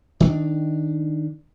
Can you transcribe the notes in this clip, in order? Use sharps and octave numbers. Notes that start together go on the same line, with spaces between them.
D#3 C4 D4